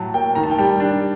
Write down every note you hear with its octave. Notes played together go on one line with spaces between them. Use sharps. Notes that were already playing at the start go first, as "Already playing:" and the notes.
Already playing: A2 F#3 A5
A#3 G5
D#3 A#5
A5
G5
G3 A5
D4